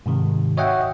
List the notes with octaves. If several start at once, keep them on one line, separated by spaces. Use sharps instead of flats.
G#2 C3 D#3
F#4 C#5 D#5 E5 F#5 G5